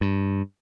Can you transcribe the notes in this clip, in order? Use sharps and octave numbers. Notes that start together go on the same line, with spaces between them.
G2